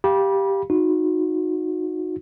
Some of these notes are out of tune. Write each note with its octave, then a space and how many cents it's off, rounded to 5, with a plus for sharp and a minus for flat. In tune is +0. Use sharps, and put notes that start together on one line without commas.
G4 +0 F5 +0 B5 -30
D#4 +0 F#4 -25